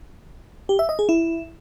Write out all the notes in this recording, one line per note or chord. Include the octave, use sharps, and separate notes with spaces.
G4
E5
D#5
G#4
E4